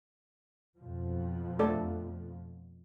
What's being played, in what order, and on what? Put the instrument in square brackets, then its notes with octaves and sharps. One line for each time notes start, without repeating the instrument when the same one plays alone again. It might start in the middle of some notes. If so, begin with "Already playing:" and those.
[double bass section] F2 B2 F3
[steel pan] A3 A4 D5